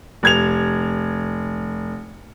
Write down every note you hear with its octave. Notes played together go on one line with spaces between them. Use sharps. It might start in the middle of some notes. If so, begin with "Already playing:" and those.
F1 G#6 F7